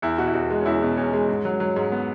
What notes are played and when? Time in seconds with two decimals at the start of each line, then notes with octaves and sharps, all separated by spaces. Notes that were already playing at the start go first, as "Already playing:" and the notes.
0.02 E2 E4
0.18 B2 F#4
0.27 E4
0.34 E2 F#4
0.50 G#3
0.61 C#4
0.66 E2 E4
0.82 B2
0.97 E2 C#4
1.13 G#3
1.29 G#2
1.45 F#3
1.60 F#3
1.76 G#2
1.92 B3